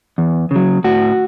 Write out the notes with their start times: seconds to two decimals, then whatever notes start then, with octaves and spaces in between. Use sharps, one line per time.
0.18 E2
0.51 C#3 F#3
0.84 A2 F#4